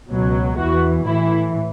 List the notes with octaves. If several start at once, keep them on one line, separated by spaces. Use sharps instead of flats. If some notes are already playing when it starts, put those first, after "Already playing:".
C#2 B2 F#3
E2 E3 F#4
A2 E3 E4